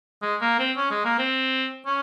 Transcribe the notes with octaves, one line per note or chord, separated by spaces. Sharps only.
G#3
A#3
C4
C#4
G#3
A#3
C4
C#4